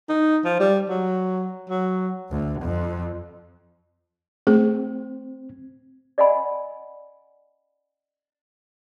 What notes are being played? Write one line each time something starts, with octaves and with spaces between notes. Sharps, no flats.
D#4
F3
G3
F#3
F#3
D2
F2
A3 C4 G#4
D5 D#5 F#5 G#5 B5